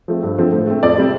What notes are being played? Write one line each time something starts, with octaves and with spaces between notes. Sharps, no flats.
F3 A3 C4
G2
D3 F3 A3 C4
A2
A3 C4
F2 D5
C3 G3 C4